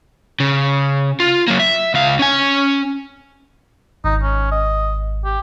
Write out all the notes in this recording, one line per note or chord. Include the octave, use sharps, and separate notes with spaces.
C#3
F4
F#3 A#3
E5
C#2 F5
C#4 G#5
G#1 D#4
C#4
D#5
G4